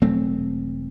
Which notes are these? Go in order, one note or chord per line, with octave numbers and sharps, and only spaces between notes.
E1 F#3 A3 C4